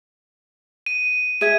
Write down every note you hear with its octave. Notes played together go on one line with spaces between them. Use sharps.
D#7
G#4 E5 G#6 D#7